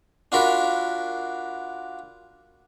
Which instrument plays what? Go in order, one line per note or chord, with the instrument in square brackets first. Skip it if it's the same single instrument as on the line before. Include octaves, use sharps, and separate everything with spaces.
[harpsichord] D4 F4 F#4 A#4 B5